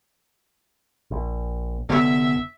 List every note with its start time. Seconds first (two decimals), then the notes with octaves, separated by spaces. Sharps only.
1.11 A#1
1.89 F1 D3 B3 E5